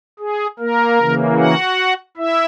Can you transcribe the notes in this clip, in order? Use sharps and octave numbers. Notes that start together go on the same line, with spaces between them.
G#4
A#3 A#4
C#3 E3 A#3
F#4 F#5
E4 E5